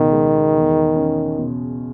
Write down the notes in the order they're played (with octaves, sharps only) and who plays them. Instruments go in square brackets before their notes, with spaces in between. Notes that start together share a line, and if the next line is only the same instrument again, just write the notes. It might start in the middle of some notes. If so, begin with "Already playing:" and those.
Already playing: [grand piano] C#2 B2 [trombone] D#3
[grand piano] G#3
E2
C#4
B2